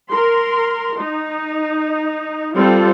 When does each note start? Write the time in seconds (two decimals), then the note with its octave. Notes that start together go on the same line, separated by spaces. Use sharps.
0.12 A#4 C6
1.00 D#4
2.57 G3 C4 F4 A4